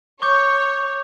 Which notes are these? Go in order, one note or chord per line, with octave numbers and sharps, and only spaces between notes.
C#5 C#6 D6 G6